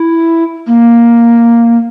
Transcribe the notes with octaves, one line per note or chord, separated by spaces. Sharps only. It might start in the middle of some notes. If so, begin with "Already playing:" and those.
Already playing: E4
A#3